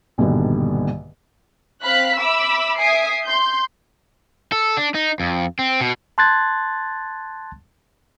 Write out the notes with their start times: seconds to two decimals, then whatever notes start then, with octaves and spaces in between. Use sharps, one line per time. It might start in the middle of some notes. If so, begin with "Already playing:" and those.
0.18 A#1 G2 B2 D3 D#3
1.84 C4 F5 B5 F#6 B6
2.18 E5 B5 D6 E6
2.78 E5 G#5 D#6 C7 D7
3.25 C6 G6
4.52 A4
4.77 D4
4.95 D#4
5.20 F2
5.59 C4
5.81 B2
6.18 A5 C6 F#6 G#6 A6